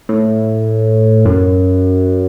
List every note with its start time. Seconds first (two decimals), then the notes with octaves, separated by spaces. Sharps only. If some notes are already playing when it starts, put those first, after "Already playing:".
0.09 A2
1.25 F#2